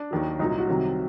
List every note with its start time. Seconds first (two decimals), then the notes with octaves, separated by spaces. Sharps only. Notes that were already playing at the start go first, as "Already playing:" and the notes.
Already playing: D4
0.11 D#2 D#3 F#3
0.39 C2 A#2 F#3 D#4
0.49 D#4
0.59 F#4
0.67 C2 C3 D#3 F#3